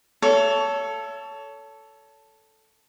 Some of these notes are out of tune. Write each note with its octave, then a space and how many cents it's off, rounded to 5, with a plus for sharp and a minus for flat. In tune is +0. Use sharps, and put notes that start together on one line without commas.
A4 +0 C#5 +25 E5 +30